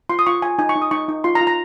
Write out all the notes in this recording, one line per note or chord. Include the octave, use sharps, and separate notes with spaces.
F4 C6
D#6
F4 C#6
F4 G#5
D#4 G#5
C#6
D#4
D#6
D#4 C#6
D#4
F4 C6
A#5
F4
A#5